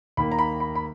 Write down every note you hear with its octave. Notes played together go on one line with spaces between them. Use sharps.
D#2 D#3 A#3 B5
A#5
B5
B5
B5